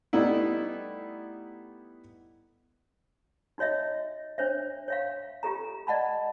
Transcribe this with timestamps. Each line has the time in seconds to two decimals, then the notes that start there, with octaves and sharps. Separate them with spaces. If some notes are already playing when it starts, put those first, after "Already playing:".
0.13 G3 A3 B3 D#4 E4
3.58 D#4 F#4 C#5 D#5 E5
4.38 D4 C5 C#5 E5
4.88 C#5 E5 F5
5.43 F4 G4 A4 A#5
5.87 D5 D#5 F#5 A5 B5